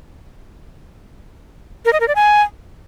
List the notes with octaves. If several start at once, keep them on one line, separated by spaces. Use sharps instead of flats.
A#4
D#5
A#4
D5
G#5